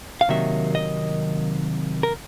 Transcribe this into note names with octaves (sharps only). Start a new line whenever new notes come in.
F5
C3 D#3 F#3 A#3 E5
D#5
A#4